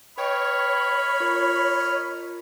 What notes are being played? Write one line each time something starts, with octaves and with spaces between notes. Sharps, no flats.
B4 C#5 D#5 G5 B5 D#6 F6
F4 A#4